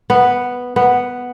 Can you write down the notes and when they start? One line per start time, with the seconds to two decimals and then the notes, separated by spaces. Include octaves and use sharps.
0.10 B3
0.76 B3